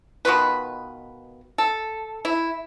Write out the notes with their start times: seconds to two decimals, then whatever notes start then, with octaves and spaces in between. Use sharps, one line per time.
0.25 B2 D#3 F4 B4
1.58 A4
2.25 E4